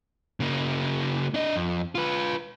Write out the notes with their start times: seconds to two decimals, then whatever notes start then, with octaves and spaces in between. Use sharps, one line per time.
0.40 C#3 A#3
1.34 D4 D#5
1.56 F2
1.95 F4 B4